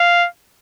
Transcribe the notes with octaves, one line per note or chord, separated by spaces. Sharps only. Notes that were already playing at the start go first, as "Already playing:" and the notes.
Already playing: F5